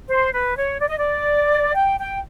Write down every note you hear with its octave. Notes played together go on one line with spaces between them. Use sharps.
C5
B4
C#5
D5
D#5
D5
G5
G5